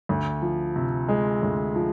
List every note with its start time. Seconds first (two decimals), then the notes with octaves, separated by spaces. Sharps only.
0.09 D2
0.42 F3
0.76 C3
1.08 G#3
1.42 D2
1.75 F3